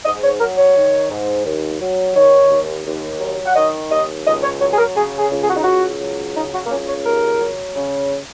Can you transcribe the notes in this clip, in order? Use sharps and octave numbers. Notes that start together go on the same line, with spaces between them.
G#2 D#5
C#5
F#3 A#4
C#5
D#3
G#2
D#2
F#3
D#3 C#5
D#2
D#2
F#3
F#5
D#3 D#5
D#2 D#5
C#2 D#5
C#5
F#3 C#5
G#4
A#4
C#3 G#4
G#4
C#2
G#4
F#4
D#4
C#2 F#4
F#3
C#3 D#4
F#4
A#3
C#2 C#4
C#5
D#2 A#4
F#3
C#3